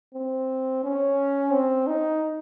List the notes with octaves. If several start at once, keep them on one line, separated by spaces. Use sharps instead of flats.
C4
C#4
C4
D#4